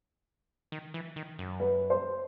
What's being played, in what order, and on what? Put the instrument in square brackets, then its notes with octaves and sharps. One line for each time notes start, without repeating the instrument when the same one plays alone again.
[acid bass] D#3
E3
D#3
F#2
[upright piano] B4
C5